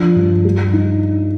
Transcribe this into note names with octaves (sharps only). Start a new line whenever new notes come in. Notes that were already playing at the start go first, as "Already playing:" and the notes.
Already playing: F3 D4
G2
G3
D#4